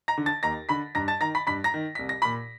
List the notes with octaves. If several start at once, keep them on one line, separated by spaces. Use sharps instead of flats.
A#5 A#6
D3
A5 A6
D#2 A#5 A#6
D3 B5 B6
G2 A#5 A#6
A5 A6
D#3 A#5 A#6
B5 B6
G2 B5 B6
A#5 A#6
D#3
C2 B6
A#6
A#2 B5 B6